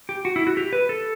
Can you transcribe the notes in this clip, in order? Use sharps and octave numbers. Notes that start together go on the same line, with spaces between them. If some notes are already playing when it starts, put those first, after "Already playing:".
G4
F#4
E4
F#4
G4
B4
A4